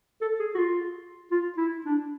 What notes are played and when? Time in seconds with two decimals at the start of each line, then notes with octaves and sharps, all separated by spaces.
0.21 A4
0.40 G#4
0.55 F#4
0.59 F4
1.31 F4
1.58 E4
1.85 D4